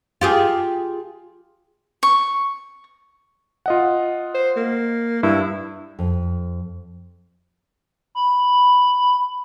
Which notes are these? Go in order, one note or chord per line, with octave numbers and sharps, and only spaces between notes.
F4 G4 G#4
C#6
F4 D#5 F#5
C5
A#3
G2 E4
F2
B5